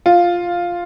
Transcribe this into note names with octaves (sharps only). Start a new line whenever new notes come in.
F4